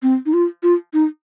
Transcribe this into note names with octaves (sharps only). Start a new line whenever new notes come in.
C4
D#4
F4
F4
D#4